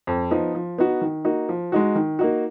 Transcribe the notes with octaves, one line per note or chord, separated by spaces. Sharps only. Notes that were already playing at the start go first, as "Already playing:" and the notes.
F2
F3 B3 D#4
F3
B3 D#4 F#4
D#3
A#3 D#4 F#4
F3
G#3 D#4 F#4
D#3
A#3 D#4 F#4